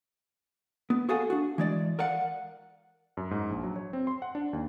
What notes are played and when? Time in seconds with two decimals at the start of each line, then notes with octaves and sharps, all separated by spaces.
0.90 B3
1.09 F#4 G#4 A4 F5 F#5 G#5
1.30 D4 F#4
1.58 E3 G#3 D5
1.99 A#4 D5 F5 F#5
3.17 F#2
3.31 G#2
3.50 A#1
3.63 F#3
3.76 C#5
3.93 C4
4.07 C6
4.22 F#5
4.35 D4
4.53 D#2